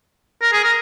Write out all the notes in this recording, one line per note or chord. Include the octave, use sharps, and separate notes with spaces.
A#4
G#4
A#4